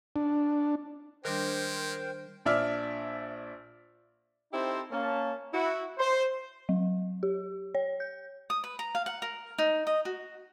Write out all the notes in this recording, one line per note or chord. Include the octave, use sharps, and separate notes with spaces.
D4
D#3 G3 G#3 D4 A#4 C5 G5
A#1 D4 D5 E5 F6
C4 D#4 E4 G4 A4 C5
A#3 C#4 A5
E4 F#4
C5
F#3
G4
C#5
G6
D#6
B4
A#5
F5
F#5
A#4
D#4
D#5
F#4